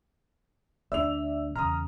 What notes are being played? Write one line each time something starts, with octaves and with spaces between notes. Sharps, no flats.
D2 D4 D5 E5 E6 F7
E2 C#3 A#5 D#6 F6